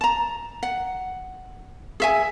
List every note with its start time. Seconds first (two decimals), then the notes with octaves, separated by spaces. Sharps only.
0.01 A5 A#5
0.63 F#5
2.00 G#4 E5 G#5